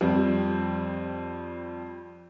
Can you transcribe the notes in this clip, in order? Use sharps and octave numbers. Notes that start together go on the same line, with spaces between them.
F2 G3 C4